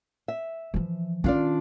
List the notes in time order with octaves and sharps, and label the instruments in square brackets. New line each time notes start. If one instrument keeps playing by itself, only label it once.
[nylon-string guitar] E5
[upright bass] E3 F3
[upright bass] D#3 C#4 [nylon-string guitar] D4 F4 D5